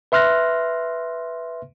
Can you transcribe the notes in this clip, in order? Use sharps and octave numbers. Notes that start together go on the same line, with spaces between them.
B4 E5 C6 F6 F#6 A#6